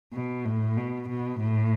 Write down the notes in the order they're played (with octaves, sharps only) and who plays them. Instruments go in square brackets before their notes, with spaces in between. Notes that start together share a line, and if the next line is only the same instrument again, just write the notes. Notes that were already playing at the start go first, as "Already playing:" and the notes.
[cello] B2
A2
B2
B2
A2